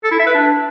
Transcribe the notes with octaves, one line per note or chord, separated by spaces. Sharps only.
A4
E4
E5
B4
D4